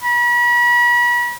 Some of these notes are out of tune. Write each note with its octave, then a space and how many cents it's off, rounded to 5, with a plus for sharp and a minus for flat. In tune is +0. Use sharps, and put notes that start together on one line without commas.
B5 -40